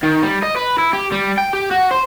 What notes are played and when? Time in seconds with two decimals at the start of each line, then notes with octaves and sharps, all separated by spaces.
0.03 D#3
0.22 G3
0.43 D#5
0.56 B4
0.78 E4
0.93 G4
1.12 G3
1.38 G5
1.53 G4
1.71 F#4
1.91 C5